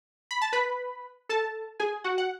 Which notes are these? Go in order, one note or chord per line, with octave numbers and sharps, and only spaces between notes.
B5
A5
B4 B5
A4 A5
G#4 G#5
F#4 F#5
F#5